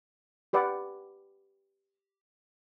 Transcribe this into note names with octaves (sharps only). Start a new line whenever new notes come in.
G4 B4 D5 F#5